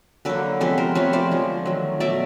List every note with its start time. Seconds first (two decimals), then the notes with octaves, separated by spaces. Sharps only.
0.25 D3 F#3 A#3 A4 B4
0.60 C3 F3 G#3 B3 A4 B4
0.78 A#4 C5
0.95 C3 F3 A3 B4 C#5
1.13 C5 D5
1.31 D3 F3 G#3
1.66 D#3 F#3 A3
2.00 B2 F#3 A3 D5 E5